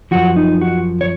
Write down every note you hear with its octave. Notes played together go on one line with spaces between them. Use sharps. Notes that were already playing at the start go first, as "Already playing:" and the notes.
F#2 F3 F#4
D#4
F#4
C#5